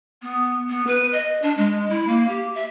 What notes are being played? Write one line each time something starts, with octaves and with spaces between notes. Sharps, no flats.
B3
B3
B4
D#5
D4
G#3
E4
A#3
G4
E5